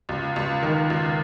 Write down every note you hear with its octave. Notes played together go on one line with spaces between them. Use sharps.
C#2
C#2
D#3
C#2